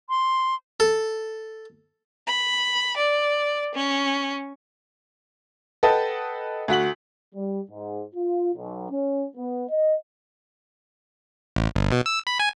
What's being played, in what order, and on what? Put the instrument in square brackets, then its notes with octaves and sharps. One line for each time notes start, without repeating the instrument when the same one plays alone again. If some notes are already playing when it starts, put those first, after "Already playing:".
[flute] C6
[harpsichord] A4
[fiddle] B5
D5
C#4
[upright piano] A4 B4 D#5 F#5 G5 A5
D2 F#4 B6 F#7
[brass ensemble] G3
G#2
F4
B1
C#4
B3
D#5
[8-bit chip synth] A1
G1
B2
E6
B5
G#5